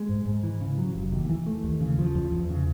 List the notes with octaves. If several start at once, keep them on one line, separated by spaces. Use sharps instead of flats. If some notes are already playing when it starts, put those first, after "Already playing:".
Already playing: G#3
G#2
G#2
E3
C#3
F#3
F1
D#2
E3
A3
D#2
C#3
F3
E2
E2
C#3